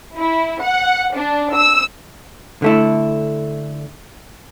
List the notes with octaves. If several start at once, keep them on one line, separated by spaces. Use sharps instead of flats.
E4
F#5
D4
E6
D3 A3 E4